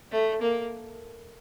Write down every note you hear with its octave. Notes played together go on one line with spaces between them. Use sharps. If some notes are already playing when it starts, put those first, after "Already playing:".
A3
A#3